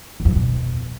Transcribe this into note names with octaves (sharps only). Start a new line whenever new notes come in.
E2
F2
D3
B2